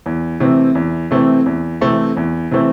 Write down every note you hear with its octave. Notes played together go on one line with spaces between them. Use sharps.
E2
C3 E3 A3 C4
E2
C3 E3 A3 C4
E2
C3 E3 A3 C4
E2
C3 E3 A3 C4